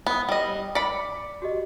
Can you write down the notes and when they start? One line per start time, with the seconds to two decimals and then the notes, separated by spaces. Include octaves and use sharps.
0.07 B3 B5 D#6
0.29 G3 D#5
0.75 D5 B5 C#7
1.42 F#4 G4 D#5